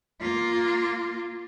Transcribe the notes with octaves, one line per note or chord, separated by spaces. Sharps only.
A#3 F4